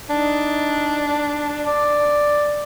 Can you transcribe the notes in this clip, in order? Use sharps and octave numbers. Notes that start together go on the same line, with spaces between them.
D4 D#4
D5